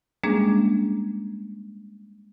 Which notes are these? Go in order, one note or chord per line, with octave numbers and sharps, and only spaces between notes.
G3 G#3 A#3 C#4 D4 G#4